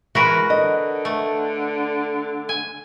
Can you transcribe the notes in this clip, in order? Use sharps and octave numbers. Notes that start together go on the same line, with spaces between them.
E3 G#3 F#4 A#4 B4
D3 D#5
A3
G#5